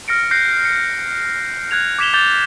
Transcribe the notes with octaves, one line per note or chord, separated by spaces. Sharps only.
F6 A#6 C#7 D7
F#6 G6 A#6 C7
C#7
F#6 G#6 F7
D6 G#6 B6 E7 F7 G7
D6 G6 A6 F7 G7